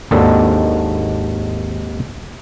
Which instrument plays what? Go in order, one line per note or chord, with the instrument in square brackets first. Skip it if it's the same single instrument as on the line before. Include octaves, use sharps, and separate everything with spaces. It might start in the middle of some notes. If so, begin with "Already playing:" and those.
[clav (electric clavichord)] G#1 D#2 D#3 D4 A4